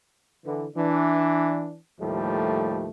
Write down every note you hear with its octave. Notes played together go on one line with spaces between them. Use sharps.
D3 E3
E3 D4
D#2 A2 F3 G3 A3